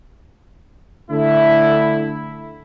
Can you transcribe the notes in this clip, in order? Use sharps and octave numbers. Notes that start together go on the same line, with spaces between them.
D3 A3 E4